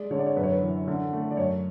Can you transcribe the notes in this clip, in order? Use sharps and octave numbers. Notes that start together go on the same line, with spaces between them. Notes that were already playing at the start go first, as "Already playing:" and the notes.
Already playing: G#3 D5
D3 C#5
D5
C#5
F#2 B4
C#5
B4
E3
D3
A3
D5
F#2 C#5